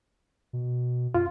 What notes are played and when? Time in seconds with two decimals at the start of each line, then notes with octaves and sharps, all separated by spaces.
0.53 B2
1.14 F#2 F4